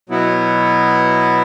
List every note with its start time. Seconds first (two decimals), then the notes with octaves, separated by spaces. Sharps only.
0.09 B2 F#3 B3 E4